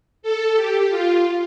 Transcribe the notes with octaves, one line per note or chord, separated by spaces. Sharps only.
A4
G4
F4